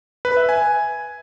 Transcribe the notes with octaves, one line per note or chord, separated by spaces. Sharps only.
B4
E5
G#5